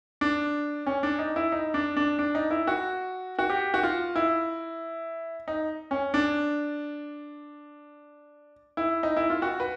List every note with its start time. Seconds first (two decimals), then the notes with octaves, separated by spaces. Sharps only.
0.21 D4
0.86 C#4
1.03 D4
1.19 D#4
1.36 E4
1.52 D#4
1.74 D4
1.97 D4
2.19 D4
2.35 D#4
2.51 E4
2.67 F#4
3.39 F#4
3.50 G4
3.74 F#4
3.83 F4
4.16 E4
5.48 D#4
5.91 C#4
6.14 D4
8.77 E4
9.03 D#4
9.17 E4
9.30 F4
9.42 F#4
9.60 B4